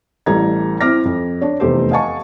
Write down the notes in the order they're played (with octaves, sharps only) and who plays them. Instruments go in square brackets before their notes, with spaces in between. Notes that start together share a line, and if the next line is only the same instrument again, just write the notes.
[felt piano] A1 G3 E4 A4 A#5 G#6
C4 E4 D6 F6 A#6
F2
D4 C#5
F1 E2 A3 G4 C5
D#5 F5 F#5 G#5 A5 C#6